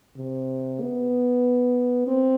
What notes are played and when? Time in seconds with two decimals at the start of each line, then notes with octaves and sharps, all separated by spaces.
0.17 C3
0.81 B3
2.07 C4